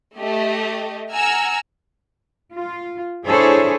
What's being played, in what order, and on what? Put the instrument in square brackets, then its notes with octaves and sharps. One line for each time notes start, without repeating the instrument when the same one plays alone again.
[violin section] A3 G4 D#5
F#5 G#5 A#5 E6 F6
[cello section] F4
D4 E4 G#4 A4 C5 C#5